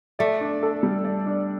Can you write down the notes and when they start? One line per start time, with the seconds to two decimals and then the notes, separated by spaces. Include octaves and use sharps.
0.19 A3 D5
0.41 D4
0.63 A4
0.83 G3
1.04 D5
1.26 D4